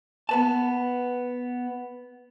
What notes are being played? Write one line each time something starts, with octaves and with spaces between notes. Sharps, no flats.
B3 B4 A5